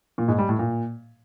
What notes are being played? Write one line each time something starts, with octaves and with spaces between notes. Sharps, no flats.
A#2
G#2
G3
A2
A#2